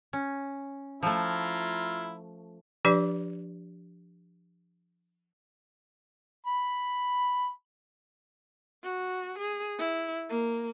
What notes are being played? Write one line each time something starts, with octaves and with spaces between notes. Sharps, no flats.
C#4
F3 A3 E4 F4 A#5
F3 D4 G4 B4 D5 D6
B5
F#4
G#4
E4
A#3